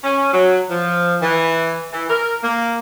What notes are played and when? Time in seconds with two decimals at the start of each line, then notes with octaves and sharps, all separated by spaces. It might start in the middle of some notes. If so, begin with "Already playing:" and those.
0.04 C#4
0.33 F#3
0.70 F3
1.22 E3
1.92 E3
2.09 A#4
2.43 A#3